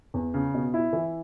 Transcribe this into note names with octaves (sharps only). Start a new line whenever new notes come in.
E2
C#3
B2
E4
E3